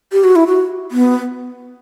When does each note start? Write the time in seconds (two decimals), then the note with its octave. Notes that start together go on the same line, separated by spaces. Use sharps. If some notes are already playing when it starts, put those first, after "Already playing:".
0.12 G4
0.24 F#4
0.36 E4
0.47 F#4
0.92 B3